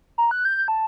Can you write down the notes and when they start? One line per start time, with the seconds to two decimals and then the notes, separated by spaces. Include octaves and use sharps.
0.18 A#5
0.31 F#6
0.45 G6
0.68 A5